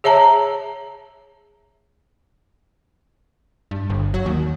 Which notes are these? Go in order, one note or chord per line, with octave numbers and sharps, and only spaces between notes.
G#4 C#5 E5 A5 A#5
G2
G1
F#3
D#2